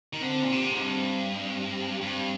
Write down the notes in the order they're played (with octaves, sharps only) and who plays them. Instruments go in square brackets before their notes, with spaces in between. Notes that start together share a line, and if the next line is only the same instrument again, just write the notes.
[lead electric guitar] D#3
[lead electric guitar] D3 [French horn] C4
[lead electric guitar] A#2
C3
G#2
[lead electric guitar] G2 [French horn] C4
[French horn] C4
C4
[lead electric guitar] G2 [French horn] C4